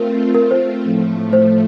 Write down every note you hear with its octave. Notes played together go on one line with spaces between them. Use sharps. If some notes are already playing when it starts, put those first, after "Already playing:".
Already playing: A3 C4 F4 A#4
A#4
C5
A2 F3 A3
C5